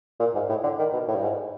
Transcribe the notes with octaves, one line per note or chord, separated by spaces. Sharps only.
A#2
G#2
A2
D3
D#3
B2
A2
G2
G#2